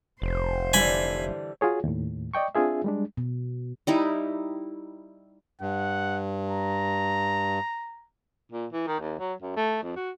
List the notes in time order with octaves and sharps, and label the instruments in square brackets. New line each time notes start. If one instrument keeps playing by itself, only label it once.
[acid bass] F1 [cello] C5
[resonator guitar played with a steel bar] D3 E3 G3 [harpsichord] G#5 B5
[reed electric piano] F4 F#4 G#4 C#5
D#2 A2
D5 D#5 G5 C#6
C4 D4 F4 G#4 E5
G3 G#3 D4
[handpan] B2
[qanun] G3 D#4 E4
[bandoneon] G2 [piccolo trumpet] F#5
[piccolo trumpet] A#5
[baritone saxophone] A#2
E3
D#3
D#2
F#3
F#2
A3
F2
F#4